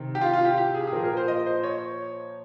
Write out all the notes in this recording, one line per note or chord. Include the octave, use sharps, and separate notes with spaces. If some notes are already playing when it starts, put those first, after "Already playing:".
Already playing: C3 D#3
G4
F4
F4
G4
G4
G#4
G#4
A#2 F3 A#4
A#4
C5
D#5
C5
C#5